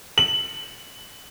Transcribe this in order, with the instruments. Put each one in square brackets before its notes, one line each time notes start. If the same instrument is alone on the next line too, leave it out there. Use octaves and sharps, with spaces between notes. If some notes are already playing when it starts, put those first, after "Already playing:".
[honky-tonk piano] F#7